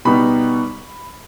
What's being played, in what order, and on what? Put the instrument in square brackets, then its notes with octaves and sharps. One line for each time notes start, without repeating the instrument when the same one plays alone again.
[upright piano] B2 G3 B3 D#4 B5